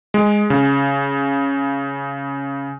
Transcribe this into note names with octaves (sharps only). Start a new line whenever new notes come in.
G#3
C#3